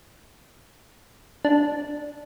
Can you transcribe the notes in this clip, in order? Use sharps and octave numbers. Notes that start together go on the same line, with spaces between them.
D4